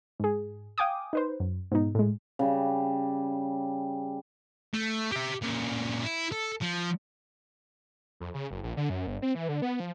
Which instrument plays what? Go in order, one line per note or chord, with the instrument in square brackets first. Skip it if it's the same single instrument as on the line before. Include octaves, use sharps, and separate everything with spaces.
[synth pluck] G#2 G#4
F5 G5 G#5 D6 D#6
D#4 B4 C5
F#2
G#2 B2 D#4
A2 G#3
[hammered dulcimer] C#3 G3
[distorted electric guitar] A3
G4 E5
A#2 C#3
E4
A4
F3
[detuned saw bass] F2
C#3
F#1
A#1
D3
F#2
G1
C4
E3
D3
B3
F3